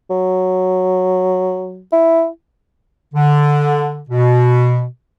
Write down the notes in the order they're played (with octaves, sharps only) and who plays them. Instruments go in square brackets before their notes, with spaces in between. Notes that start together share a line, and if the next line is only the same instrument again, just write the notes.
[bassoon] F#3
E4
[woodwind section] D3
B2